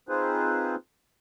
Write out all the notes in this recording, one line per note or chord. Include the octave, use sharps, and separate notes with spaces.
C4 D#4 F4 G#4 B4 C5